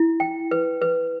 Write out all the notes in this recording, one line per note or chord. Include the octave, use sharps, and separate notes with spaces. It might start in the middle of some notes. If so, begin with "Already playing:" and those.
Already playing: E4
G5
B4
B4